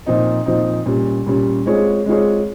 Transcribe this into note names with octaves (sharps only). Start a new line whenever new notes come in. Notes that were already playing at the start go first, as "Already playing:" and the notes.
A#2 F3 C4 D#4
A#2 F3 C4 D#4
A#2 G3 C#4
A#2 G3 C#4
G#3 C4 F4 G#4 C#5
G#3 C4 F4 G#4 C#5